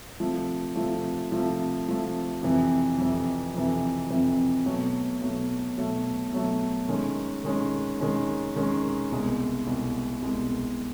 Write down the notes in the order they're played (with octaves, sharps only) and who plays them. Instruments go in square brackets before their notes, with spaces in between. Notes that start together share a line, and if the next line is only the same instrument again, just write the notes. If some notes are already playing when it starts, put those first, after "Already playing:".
[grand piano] C3 F3 A3
C3 F3 A3
C3 F3 A3
C3 F3 A3
F2 C3 E3
F2 C3 E3
F2 C3 E3
F2 C3 E3
B2 F#3 A3
B2 F#3 A3
B2 F#3 A3
B2 F#3 A3
D#3 G#3 C#4
D#3 G#3 C#4
D#3 G#3 C#4
D#3 G#3 C#4
C2 B2 G#3
C2 B2 G#3
C2 B2 G#3